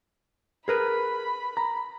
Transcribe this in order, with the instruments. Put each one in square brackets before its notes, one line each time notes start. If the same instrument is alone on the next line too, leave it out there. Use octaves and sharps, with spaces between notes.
[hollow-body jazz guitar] G#4 A#4 B4 [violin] B5
[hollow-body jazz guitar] A#5